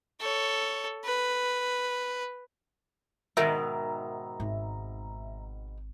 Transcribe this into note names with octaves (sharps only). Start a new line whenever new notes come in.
A4 C#5
B4
G#2 B2 D#3 A#4 E5 A#5
G#1